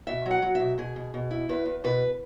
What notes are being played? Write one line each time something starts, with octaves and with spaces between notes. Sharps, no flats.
B2 E5
F#3
F#5
F#3
B2 E5
B2 G#4
B2
B2
E4
E2 B4
E2
B2 B4